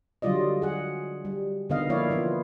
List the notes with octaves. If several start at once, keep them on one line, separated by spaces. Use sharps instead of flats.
D3 F#3 G3 F4 D5 D#5
G#4 F#5
G3
D3 D#3 B3 D#5 F5
F3 A#3 E4 C#5 D5 F5
E3 F3 B3 F4